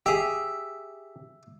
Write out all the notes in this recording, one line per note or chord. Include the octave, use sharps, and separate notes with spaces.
G4 G#4 E5